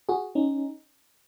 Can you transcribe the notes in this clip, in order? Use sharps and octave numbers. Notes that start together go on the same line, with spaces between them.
F#4 G#4
C#4 D#4